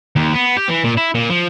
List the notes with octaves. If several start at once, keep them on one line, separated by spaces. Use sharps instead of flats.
D#2
B3
G4
E3
A#2
E4
A#2
F3